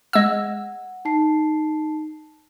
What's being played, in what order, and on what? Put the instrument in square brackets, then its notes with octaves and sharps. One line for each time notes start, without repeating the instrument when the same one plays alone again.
[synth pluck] G#3 E6 [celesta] F#5
[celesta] D#4 A5 C7